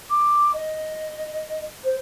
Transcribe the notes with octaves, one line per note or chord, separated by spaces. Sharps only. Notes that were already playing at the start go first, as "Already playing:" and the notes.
D6
D#5
C5